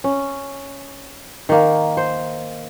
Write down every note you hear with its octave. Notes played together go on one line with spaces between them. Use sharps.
C#4
D#3 A#3
C5